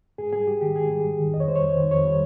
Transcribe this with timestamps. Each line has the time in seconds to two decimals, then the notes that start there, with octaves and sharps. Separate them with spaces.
0.18 G#2 G#4
0.33 G3 G#4
0.47 G#2 G4
0.61 D#3 G4
0.76 G#2 G#4
0.90 G3
1.05 G#2
1.19 D#3
1.34 F2 D#5
1.40 C#5
1.48 G3 C5
1.55 C#5
1.61 F2
1.76 D#3
1.91 F2 C#5
2.05 G3